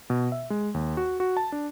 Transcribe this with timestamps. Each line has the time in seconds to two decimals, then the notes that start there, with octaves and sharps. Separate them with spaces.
0.10 B2
0.32 E5
0.50 G#3
0.74 D#2
0.97 F#4
1.20 F#4
1.37 A5
1.52 D4